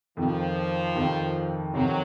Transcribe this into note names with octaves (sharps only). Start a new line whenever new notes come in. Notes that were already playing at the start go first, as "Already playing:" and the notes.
F2 C3 D#3 F3
F2 C3 D#3
F2 C3 D#3 F#3